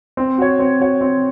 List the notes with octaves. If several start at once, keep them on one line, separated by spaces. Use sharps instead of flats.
C4
F#4 C#5
C4
F#4 C#5
C4